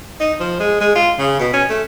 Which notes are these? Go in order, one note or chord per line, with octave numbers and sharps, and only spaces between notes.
D#4
F3
G#3
G#3
F4
C#3
B2
C#4
A3